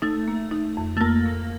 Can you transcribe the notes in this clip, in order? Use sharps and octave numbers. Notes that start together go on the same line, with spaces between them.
A3 D#4
A#3
D#4
F2
A3
F2 A#3
A#3